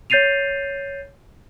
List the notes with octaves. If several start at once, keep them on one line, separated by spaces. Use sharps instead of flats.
C#5 G6 A6 C7 D#7 F7